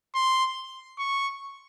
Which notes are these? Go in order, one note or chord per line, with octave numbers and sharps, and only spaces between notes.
C6
C#6